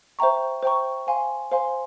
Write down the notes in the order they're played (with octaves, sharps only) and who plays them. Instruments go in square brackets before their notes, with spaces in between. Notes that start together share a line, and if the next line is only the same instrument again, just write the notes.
[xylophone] C5 E5 G5 A#5 C#6
C5 E5 G5 A#5 C#6
C5 F5 G#5 C6
C5 F5 G#5 C6